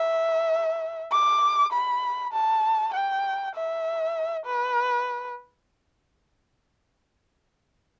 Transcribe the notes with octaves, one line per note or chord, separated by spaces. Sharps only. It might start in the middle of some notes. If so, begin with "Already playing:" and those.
Already playing: E5
D6
B5
A5
G5
E5
B4